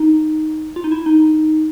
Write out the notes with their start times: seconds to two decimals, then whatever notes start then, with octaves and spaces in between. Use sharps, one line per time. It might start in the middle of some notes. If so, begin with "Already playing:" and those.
Already playing: D#4
0.76 F4
0.84 D#4
0.92 E4
1.06 D#4